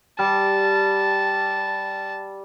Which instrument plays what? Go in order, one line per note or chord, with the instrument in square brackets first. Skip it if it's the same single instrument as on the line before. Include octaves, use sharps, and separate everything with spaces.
[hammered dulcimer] G3 [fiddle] A5